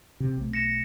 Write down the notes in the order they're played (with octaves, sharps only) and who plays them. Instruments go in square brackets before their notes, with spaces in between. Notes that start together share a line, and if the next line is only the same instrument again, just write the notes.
[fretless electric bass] C3
B1 A3
[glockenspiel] A#6 C#7 E7